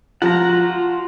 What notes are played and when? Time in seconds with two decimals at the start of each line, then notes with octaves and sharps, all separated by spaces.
0.22 F3 F#5 A#5
0.49 F4 F#4